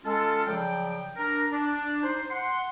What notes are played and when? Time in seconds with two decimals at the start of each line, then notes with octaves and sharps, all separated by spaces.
0.05 G#3 C#4 F4 A4
0.47 C#3 F3 F#3 D5 G5
1.16 D4 A#4
1.50 D4
2.03 D#4 C5
2.30 F#5 C6